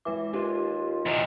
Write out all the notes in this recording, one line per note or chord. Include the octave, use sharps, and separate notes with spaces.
E3 G#3 B4 D6
D#2 D#4 F4 G4 B4
E2 C3 D#4